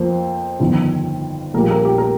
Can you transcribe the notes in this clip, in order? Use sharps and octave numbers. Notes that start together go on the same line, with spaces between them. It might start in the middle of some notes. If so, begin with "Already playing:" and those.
Already playing: F2 F3 A#3 C5
G1 F2 D#3
A#1 A#2 G3 A#3 A#4
A#4
G4
A#4